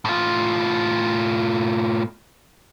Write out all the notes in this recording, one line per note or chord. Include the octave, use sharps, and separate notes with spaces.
A2 F4